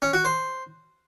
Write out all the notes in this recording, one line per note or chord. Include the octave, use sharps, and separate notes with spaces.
C#4
F#4
C5